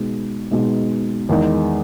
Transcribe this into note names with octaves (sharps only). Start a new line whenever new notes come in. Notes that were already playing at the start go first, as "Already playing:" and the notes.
Already playing: B2 G#3 D#4
B2 G#3 D#4
E2 D#3 G#3 D#4